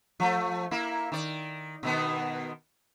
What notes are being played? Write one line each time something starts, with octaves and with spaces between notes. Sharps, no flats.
F3 A3
A#3 E4
D#3 D5
B2 D#3 B3